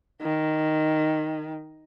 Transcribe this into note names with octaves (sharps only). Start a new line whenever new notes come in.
D#3